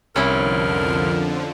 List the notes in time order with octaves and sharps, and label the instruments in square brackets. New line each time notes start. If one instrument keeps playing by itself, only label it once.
[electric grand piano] C2 [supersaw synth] F2 D3 F3 [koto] C#4 E4 [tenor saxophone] A#4